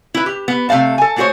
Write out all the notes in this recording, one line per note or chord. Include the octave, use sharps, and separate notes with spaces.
E4 B4
G4
B3
C3 A3 D5 F5 A5
A4 G#5
G#3 A3 F#4 G#4 C5 C#5